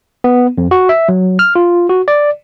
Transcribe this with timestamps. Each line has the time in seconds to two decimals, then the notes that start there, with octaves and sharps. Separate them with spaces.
0.24 B3
0.58 F2
0.71 F#4
0.89 E5
1.09 F#3
1.39 F6
1.55 F4
1.90 F#4
2.08 D5